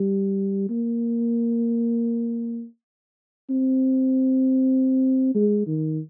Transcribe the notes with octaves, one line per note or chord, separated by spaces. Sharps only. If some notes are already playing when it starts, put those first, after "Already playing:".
Already playing: G3
A#3
C4
G#3
D#3